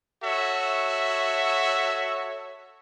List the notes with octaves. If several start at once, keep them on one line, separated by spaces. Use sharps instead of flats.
F#4 A4 C#5 E5